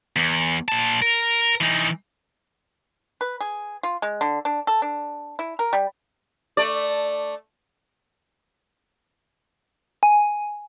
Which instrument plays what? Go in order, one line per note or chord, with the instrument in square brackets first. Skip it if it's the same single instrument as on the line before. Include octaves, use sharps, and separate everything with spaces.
[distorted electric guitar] E2
A#2 A5
A#4
E3 D#4
[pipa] B4
G#4
F4
G#3
D3
D4
A4
D4
E4
A#4
G3
[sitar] A3 D5
[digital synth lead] G#5